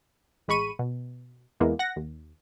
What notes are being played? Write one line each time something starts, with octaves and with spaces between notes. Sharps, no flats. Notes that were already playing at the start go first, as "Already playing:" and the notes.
A1 G#3 B5 C#6 D#7
B2
E2 G#3 A#3 B3 E4
F#5 A#6
D#2